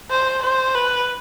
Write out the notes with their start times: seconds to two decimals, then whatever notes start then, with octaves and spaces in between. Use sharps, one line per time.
0.10 C5
0.44 C5
0.75 B4